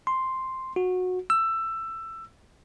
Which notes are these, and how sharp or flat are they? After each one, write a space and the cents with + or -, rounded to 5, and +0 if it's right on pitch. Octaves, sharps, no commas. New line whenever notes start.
C6 +0
F#4 -20
E6 +15